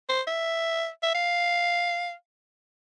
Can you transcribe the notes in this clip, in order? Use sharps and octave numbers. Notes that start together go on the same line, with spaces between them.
C5
E5
E5
F5